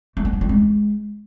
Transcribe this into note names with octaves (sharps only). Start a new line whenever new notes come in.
A3
F#3
B3
C4
G#3